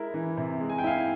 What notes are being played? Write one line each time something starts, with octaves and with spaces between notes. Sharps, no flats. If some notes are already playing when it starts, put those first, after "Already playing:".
Already playing: G#3 E4 A#4
E3
C3
G#3
G#5
G5
E4 F5 G#5